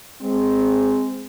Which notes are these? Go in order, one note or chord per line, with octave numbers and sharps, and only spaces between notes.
G#3 C4